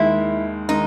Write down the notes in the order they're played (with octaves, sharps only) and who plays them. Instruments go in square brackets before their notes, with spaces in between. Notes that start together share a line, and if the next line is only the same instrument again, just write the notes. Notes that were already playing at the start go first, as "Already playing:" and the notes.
Already playing: [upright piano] D#2 D#3 G#3 [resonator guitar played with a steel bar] E4
[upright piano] D#3 G#3 [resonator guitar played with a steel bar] D#4